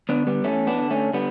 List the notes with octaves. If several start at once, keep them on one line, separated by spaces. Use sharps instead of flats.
D3 B3 D4
G3 B3
E2 A3 C#4
B3 D4
D3
A3 C#4
D3 G3 B3